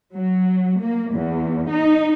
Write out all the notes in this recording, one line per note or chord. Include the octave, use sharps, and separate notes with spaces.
F#3
A#3
E2
D#4